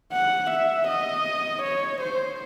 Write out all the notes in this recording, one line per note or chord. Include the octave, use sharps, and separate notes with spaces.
F#5
E5
D#5
C#5
C5